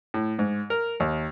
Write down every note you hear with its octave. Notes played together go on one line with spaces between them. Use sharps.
A2
G#2
A#4
D#2